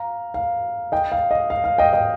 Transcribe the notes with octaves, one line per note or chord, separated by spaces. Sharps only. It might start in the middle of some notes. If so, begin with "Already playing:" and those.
Already playing: F5 A#5
F5
D#5 G5
F5
D#5
F5
F5
D#5 G5
D#5 G5